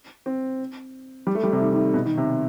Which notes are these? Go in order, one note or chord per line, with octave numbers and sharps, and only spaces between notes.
C4
G3
A3
G3
C3
D#3
D#3
B2
D#3
C3